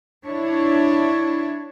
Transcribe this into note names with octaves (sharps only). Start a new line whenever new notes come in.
D4 E4 C#5